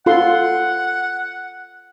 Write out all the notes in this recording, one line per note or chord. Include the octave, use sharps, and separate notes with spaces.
F4 A4 F#5 C6